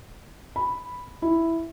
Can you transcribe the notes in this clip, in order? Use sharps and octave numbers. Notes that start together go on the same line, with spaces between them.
B5
E4